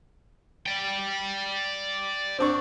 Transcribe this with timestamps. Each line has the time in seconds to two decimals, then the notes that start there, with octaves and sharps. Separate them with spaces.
0.66 D5 G5
2.39 C4 D4 C#6